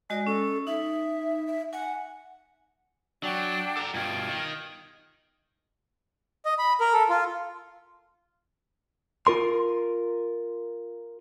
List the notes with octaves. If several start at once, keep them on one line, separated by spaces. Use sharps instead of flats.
G#3 F#4 D5 D#5
C#4 A4
D#4 E5
E5
F#5 G#5
F#3 D4 F#5 G5
A4 A#5
G2 B2 F4 G5 G#6
D#3
D#5
B5
A#4
A4
F4
F4 A#4 C6